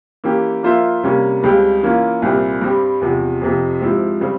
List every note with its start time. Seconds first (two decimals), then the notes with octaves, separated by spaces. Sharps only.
0.24 E3 A#3 C#4 G4
0.63 F3 A#3 F4 C5 E5
1.03 C3 G3 A#3 C#4
1.43 C#2 C#3 G3 C4 G4
1.83 E3 A#3 C#4 F4
2.22 C2 A#2 G3 C4 G4
2.61 G2 G3 C4 G4
3.01 E2 C3 F3
3.42 F2 C3 F3
3.81 G#2 F3 C4 E4 G4
4.21 C#3 G3 C4